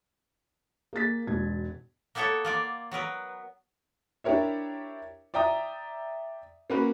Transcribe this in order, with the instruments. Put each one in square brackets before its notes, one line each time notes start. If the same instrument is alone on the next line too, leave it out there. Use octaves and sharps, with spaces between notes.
[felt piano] A#3 G#4 A6 B6
E1 G#2 B2 G#6
[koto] A#3 B3 E4 A4 C#5 E5
A#3 F4 D5
F#3 B3 A#4 B4
[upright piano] D4 E4 G4 A#4 C#5 E5
D5 E5 G5 A#5 D#6
A#3 B3 C#4 F#4 A#4 B4